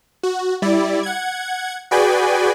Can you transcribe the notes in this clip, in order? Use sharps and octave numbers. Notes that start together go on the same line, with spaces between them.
F#4
G3 E4 D5
F#5 G#6
F#4 G#4 B4 D5 G5 G#5